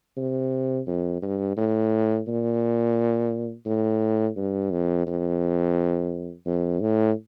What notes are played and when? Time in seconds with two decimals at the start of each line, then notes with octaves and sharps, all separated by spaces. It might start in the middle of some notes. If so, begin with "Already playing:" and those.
0.17 C3
0.87 F2
1.22 G2
1.57 A2
2.28 A#2
3.66 A2
4.36 G2
4.71 F2
5.07 F2
6.46 F2
6.81 A2